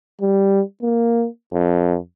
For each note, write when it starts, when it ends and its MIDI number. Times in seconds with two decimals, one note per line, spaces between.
0.22 0.61 55
0.83 1.27 58
1.53 1.97 41